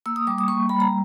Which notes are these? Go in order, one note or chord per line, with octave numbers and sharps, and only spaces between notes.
A#3 E6
D#6
G3 D6
D#6
A#3 C#6
G3 B5
A#5